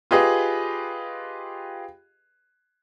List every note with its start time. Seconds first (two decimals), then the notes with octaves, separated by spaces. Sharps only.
0.11 F4 G4 G#4 B4 D#5